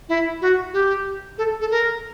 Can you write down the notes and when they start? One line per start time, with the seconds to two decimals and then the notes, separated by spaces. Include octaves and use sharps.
0.09 E4
0.41 F#4
0.73 G4
1.38 A4
1.61 A4
1.71 A#4